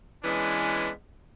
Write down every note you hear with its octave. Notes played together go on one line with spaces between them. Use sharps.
E3 G#3 B3 C#4 D4